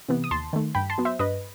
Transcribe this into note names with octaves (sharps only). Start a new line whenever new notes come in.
C3 E3 B3
D#6
D#2 A5 C6
D#3 A3
G2 G5 B5
A5 C6
F#3 B3
C5 E5
G2 B4 D#5